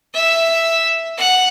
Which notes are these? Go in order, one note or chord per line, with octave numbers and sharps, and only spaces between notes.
E5
F#5